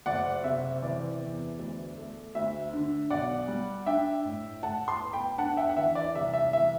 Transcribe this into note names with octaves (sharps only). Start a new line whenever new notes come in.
F#1 D5 F#5
C3 E5
E3 D5
E2
D2
A3
D2 E5
D3
B1 D5 F#5
G3
D4 E5 G5
A2
A2 F#5 A5
A5 C6
B3
G5 B5
D4 F#5 A5
E5 G5
F#5
E3 E5
D5
C2 E5
E5
E3 E5